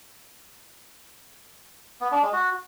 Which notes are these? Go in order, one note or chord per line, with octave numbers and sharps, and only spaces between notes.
B3
D4
G#3
F#4